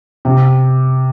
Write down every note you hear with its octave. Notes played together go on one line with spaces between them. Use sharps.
C3